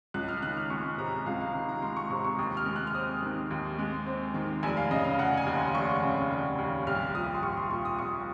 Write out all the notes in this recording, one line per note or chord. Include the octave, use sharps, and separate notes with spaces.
C#2 F#6
F6
D#3 F#6
F6
G#3 C#6
C3 A#5
C#2 F5
F5
D#3
A#5
G#3 C6
C#6
C3 C#6
C#6
D#2 D#6
F6
G#3
F#6
F6
C4 D#6
D#3
D#2
G#3
C4
D#3
F1 G#5
F5
C#3 D#5
F5
F1 F#5
G#5
D#2
C6
F1 C#6
C#3
F1
D#2
C2 F6
F3 D#6
C6
C2 C#6
C6
A#2 C#6
D#6
C2 C#6